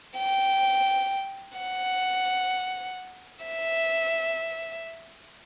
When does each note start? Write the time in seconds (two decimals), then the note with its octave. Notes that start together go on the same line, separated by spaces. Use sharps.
0.18 G5
1.58 F#5
3.45 E5